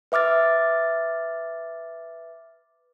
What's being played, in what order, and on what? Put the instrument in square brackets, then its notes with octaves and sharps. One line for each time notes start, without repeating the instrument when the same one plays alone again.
[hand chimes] B4 E5 D6 F6 A6